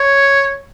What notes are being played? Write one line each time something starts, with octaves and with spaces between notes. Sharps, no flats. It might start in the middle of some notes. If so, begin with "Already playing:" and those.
Already playing: C#5